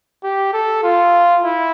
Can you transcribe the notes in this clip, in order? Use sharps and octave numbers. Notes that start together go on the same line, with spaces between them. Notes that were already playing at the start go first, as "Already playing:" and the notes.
G4
A4
F4
E4